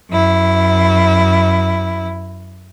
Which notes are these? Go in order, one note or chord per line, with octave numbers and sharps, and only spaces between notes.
F#2 E4